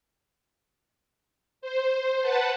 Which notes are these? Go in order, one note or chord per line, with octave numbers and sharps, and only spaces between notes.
C5
B4 F#5 A5